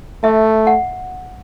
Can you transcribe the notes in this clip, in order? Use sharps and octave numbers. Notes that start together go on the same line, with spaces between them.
A3 E5
F#5